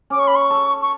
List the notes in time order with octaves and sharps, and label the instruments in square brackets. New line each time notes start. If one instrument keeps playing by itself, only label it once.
[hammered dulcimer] C#4 [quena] D6
[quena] C#6
B5
C#6
[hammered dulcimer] A4
[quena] C#6